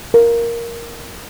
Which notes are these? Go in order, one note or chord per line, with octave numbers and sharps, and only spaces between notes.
A#4